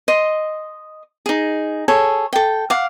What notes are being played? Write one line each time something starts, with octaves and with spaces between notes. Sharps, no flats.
D#5 C6
D#4 G#4
G#4 A4 C#5
A4 G5
F5 F#5 D6